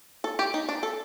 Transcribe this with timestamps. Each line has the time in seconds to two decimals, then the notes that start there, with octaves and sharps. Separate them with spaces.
0.24 A4
0.39 G4
0.54 D#4
0.69 D4
0.83 A4